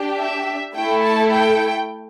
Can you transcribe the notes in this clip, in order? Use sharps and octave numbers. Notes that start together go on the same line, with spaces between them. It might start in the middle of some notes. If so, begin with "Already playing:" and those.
Already playing: D4 G4
E5
A3 E4 A4 G5
A5
G5